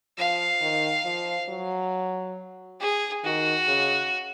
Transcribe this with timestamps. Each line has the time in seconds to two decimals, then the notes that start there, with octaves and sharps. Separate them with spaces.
0.18 F3 F5
0.61 D#3
1.05 F3
1.49 F#3
2.80 G#4
3.24 D#3 F#4
3.67 C#3